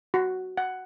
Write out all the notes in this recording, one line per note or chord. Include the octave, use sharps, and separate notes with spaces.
F#4
F#5